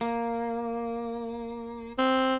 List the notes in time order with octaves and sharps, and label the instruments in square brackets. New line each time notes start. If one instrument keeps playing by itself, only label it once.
[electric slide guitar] A#3
[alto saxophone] C4